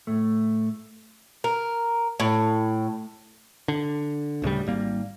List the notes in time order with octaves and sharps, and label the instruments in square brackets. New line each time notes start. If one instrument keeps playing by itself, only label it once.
[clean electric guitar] A2 A3
[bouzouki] A#4
A2
[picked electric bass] D3
D1 D2 C#3 G3
G#1 G3 A#3